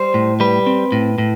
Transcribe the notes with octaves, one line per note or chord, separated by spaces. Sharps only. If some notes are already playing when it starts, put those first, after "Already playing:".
Already playing: G3 C5
A2
G3 B4
C4
A2
A2